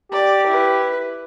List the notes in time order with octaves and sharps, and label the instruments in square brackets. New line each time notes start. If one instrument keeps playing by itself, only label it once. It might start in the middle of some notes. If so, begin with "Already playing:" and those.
[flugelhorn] G4 [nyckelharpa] D5
[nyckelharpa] E4 B4